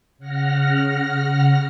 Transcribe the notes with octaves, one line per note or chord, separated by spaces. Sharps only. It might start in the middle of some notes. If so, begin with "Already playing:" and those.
C#3 F#5 F6 A#6